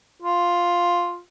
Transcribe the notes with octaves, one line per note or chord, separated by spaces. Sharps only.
F4